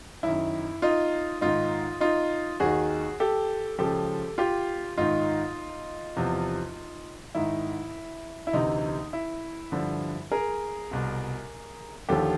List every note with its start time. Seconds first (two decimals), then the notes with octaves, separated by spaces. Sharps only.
0.23 F#2 D#3 E4
0.82 D#4 F4
1.41 G#2 D#3 D#4 F4
2.01 D#4 F4
2.60 D#2 D#3 F#4 G#4
3.20 G4 A4
3.78 C#2 C#3 F3 G4 A4
4.38 F4 G4
4.98 G#2 D#3 D#4 F4
6.16 E2 C3 F3
7.35 G#2 D#3 E4
8.47 E4
8.53 D2 C3 E3 D#4
9.13 E4
9.72 G2 D3 F3
10.32 G#4 A#4
10.91 C2 B2
12.09 D#2 D3 F3 G4 A4